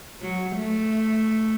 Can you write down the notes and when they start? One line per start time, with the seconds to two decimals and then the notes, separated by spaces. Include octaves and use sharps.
0.21 F#3
0.57 A3